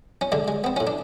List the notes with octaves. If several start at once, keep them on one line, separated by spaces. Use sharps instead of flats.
C#4
D3 G#3 D4
G#3
B3 C4
A2 C#4
D4